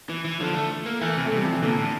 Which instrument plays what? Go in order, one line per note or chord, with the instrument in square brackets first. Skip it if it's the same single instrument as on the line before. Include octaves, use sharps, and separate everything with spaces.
[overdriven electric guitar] E3
E3
[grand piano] D3 [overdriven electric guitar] F3
[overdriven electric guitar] A3
A#3
[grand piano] E3 [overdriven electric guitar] A3
[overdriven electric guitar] C3
[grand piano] A3
[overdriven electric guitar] C3 [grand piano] G3
[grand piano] F3
E3
[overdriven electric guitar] A#2 [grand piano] D3
[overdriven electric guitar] A2